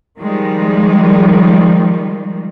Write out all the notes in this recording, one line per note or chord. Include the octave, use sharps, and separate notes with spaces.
D#3 F3 G3 G#3